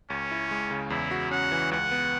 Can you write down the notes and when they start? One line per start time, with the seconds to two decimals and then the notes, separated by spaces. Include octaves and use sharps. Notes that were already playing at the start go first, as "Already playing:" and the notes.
0.10 C#2 C#4
0.31 E4
0.51 G#3
0.71 C#3
0.90 E2 E4
1.11 F#4
1.31 C#4 F#5
1.52 E3
1.71 C#2 F#5
1.91 B3